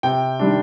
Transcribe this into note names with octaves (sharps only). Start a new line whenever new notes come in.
C3 G5
D#3 G3 D4